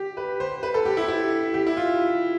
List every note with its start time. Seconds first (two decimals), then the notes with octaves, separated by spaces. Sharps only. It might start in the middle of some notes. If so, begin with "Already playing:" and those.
Already playing: G4
0.17 B4
0.40 C5
0.63 B4
0.74 A4
0.85 G4
0.97 E4
1.08 E4
1.54 G4
1.67 E4
1.77 F4